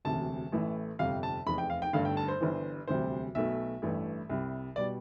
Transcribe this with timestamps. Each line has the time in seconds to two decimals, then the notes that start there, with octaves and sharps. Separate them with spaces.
0.05 E1 D2 C3 A5
0.52 A1 A2 E3 A3
0.99 G1 F2 C3 G3 F5
1.23 A5
1.46 F1 E2 C3 B5
1.58 G5
1.70 F5
1.82 G5
1.93 G1 G2 D3 A3 F5
2.05 G5
2.17 A5
2.28 C5
2.41 G1 G2 E3
2.88 E1 D2 C3 G3 C5
3.35 B1 B2 A3 E5
3.82 A1 G2 E3 A3
4.29 C2 C3 G3
4.76 B2 G3 D5